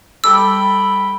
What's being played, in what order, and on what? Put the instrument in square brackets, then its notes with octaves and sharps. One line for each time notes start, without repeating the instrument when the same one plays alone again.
[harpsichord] G3 A4 D5 [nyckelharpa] G5 B5 [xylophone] E6